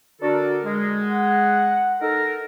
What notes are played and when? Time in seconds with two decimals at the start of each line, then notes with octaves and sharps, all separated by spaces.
0.22 D3 D4 F#4 A4 A#4
0.66 G#3
1.03 F#5
2.02 D#4 A4 A#4